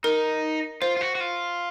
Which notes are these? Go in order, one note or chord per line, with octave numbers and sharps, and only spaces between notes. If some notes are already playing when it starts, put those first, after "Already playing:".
D#4 A#4
F4 C5
F4
F#4
F#4
F4